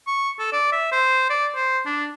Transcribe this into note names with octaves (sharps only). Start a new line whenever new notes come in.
C#6
A4
D5
E5
C5
D5
C5
D4